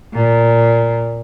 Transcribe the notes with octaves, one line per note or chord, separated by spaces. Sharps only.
A#2